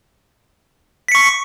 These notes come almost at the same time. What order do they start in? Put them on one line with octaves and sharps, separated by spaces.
B6 C#7 C#6